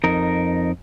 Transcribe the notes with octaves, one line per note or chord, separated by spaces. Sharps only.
F2 D#4 A#4